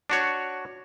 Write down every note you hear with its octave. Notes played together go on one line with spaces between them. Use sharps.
D4 F#4 C#5